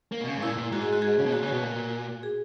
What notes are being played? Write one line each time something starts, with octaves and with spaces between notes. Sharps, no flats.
A#3
B2
C#3
G#2
A#2 E4
A#2
G#2 F#4
G#4
F#4
G#4
C#3
B2
A#2 F#4
C#3
F#4
B2
A#2
G#4